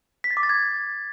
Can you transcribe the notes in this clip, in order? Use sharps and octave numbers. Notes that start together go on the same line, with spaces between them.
B6
A6
D6
A6
G#6